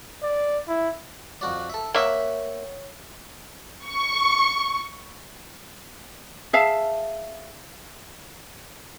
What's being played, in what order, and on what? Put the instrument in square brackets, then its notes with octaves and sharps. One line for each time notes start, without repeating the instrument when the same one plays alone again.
[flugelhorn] D5
E4
[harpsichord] F2 F#4 D5
A4 E5
[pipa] A#3 E5 [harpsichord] C#5 F#5 G5
[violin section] C#6
[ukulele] G#4 E5 F5 A5